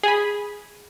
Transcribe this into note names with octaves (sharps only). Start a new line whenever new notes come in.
G#4 G#5 B5